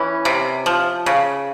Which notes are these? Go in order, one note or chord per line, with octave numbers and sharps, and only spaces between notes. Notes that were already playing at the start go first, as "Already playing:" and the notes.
Already playing: E3 C#4
C3
F3
C#3